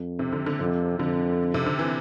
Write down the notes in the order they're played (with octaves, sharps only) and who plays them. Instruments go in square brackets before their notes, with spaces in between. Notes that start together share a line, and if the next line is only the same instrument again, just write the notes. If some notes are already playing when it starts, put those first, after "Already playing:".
Already playing: [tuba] F2
[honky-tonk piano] C3
D3
D3
[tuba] F2 [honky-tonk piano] C3
[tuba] F2 [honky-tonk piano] D3
[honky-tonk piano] C3
D3
E3